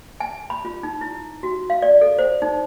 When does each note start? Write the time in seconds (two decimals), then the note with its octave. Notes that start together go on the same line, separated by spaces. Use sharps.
0.20 G#5
0.50 B5
0.65 F4
0.83 D#4
1.01 E4
1.43 F#4
1.70 F5
1.82 D5
2.01 A4
2.19 C5
2.42 D#4